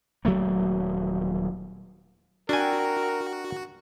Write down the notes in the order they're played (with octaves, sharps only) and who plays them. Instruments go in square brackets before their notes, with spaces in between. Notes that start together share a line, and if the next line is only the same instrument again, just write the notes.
[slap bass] D#1 F#3 A3 A#3
[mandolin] C4 E5 G5 [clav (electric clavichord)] D4 G#5 [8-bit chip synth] F#4 [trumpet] A#4